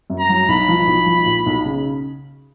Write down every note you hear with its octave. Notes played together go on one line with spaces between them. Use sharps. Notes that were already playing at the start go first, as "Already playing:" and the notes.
F#2
A#5
F#3
B1 B5
F3
B1
F3
A#2
B1
C#3